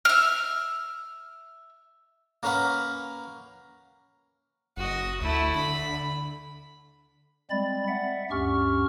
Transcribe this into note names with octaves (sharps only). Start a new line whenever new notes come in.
E5 F6
A#3 C#4 A#4 B4 F#5
F#1 F#4 D#5
D2 A3 E4
D3 B5
G3 G#3 C4 D5 B5 A6
E5 F#5
D2 G2 C#4 G4 C#6 F6